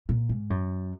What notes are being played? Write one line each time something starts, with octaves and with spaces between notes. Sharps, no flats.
A#2
G#2
F#2